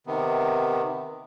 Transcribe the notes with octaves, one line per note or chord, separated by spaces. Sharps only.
C3 D#3 B3